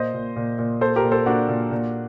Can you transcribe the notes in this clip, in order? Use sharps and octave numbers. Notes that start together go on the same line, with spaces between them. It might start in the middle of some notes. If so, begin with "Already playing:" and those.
Already playing: A#2 C5 D#5
A#2
A#2
A#2
A#2 A4 C5
G4 A#4
A#2
A4 C5
A#2 D4 F#4
A#2
A#2